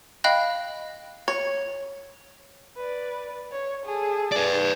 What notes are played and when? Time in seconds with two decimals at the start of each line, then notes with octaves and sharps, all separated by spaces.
0.24 D#5 F5 G5 B5 F#6 A#6
1.28 C#5
2.77 B4 D5
3.52 C#5
3.86 G#4 A4
4.32 B4 D5